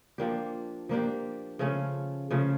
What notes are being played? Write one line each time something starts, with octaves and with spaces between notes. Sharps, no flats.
F3 A#3 D4 G4
F3 A#3 D4 G4
C#3 F3 A3 C#4
C#3 F3 A3 C#4